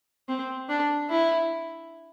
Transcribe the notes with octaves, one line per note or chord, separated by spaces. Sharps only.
C4
D4
E4